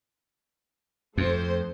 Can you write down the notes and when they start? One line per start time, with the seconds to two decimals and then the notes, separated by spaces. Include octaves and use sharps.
1.18 F2 A3 C5